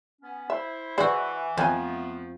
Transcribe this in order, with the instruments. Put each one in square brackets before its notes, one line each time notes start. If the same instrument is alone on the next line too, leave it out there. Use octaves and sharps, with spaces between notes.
[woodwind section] B3 C#4
[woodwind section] E4 C5 [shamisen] E5
[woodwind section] E3 [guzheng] E4 F#4 [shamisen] G#4 C5 D5
[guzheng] F2 [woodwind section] F3 A3 B3 [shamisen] C5 G5 G#5